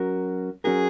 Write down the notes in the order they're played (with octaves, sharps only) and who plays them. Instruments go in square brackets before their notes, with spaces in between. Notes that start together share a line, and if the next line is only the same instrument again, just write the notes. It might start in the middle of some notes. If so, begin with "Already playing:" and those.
Already playing: [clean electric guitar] F#3 C#4 F#4 A#4
[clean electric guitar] F#3 C#4 F#4 A#4 [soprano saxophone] G#4